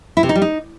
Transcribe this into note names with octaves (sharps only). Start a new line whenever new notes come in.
E4
C3
D#4
G3
D#4